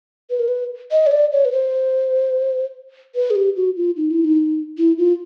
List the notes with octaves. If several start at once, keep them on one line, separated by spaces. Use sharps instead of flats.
B4
A#4
B4
D#5
C#5
D5
C#5
B4
C5
B4
G#4
G4
F#4
F4
D#4
E4
D#4
E4
F4